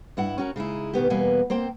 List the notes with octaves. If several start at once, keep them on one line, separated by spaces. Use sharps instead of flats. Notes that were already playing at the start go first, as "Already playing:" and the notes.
G2 E4 F#5
C#4 F#4 A#4
C#3 G#3 D#4 E4
B2 D#3 B3 G4
E2 B2 G3 A#3 B3 G#5
A#3 C4 C5 G5